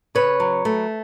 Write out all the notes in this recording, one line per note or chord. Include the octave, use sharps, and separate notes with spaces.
C#3 B4 C#5
F#3
A3